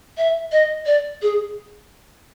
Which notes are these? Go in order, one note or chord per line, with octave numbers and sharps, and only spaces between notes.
E5
D#5
D5
G#4